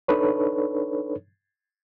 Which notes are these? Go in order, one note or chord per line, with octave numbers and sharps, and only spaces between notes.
D4 D#4 A4 B4 C#5